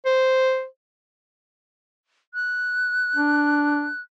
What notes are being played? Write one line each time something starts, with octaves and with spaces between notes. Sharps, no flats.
C5
F#6
D4